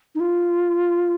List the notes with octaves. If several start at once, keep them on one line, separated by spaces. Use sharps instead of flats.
D#4
F4